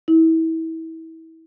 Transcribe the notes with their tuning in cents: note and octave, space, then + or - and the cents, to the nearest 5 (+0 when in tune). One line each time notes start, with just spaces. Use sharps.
E4 -30